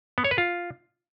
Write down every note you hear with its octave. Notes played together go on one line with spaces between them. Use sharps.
B3
C#5
B4
F4